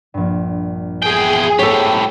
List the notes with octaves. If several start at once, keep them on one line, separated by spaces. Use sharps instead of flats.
A#1 G2
E2 G#4 G5
A2 A3 B3 G4 A4 C5 C#5